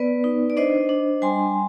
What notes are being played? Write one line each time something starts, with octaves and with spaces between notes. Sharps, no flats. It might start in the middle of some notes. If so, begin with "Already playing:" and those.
Already playing: B3 B4 D5
D#4
D5
D4 C5 D#5
D4
G3 G#5 C6